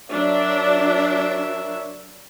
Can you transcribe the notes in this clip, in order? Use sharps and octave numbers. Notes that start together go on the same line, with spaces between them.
F#3 D4 A#4 C#5 E5